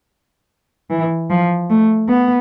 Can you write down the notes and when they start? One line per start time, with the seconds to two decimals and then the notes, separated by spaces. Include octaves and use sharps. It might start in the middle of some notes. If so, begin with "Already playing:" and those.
0.90 E3
1.30 F3
1.70 A3
2.09 B3